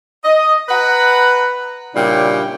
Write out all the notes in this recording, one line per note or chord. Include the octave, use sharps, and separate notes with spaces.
D#5
B4 F#5 A#5
A#2 C#3 G3 D4 E4 G5